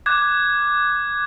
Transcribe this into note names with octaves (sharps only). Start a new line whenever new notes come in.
D6 F#6 G#6